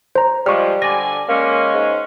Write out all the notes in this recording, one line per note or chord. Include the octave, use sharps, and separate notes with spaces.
C5 A#5
F3 G3 G#3 C#6 F6
D3 D5 G#5 A#6
G#3 A#3 C#4
G#2